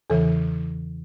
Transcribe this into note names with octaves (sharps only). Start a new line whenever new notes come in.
E2 C#3 E3 A4